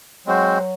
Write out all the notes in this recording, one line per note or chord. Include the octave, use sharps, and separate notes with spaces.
F#3 G#3 C4 F#4 C5